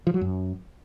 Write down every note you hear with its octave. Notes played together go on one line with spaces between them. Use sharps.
F3
F#3
F#2